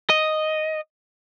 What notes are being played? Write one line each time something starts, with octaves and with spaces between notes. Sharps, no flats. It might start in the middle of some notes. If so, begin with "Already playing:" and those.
D#5